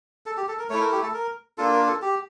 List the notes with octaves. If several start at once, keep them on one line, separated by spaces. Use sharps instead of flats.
A4
G4
A4
A#4
A3 E4 C#5
A#4
G4
A4
A#4
A#3 D4 F4 A4
A#4
A4
G4